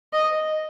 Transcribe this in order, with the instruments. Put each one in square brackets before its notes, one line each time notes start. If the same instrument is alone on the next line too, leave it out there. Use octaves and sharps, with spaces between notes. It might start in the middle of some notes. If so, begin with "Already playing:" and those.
[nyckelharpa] D#5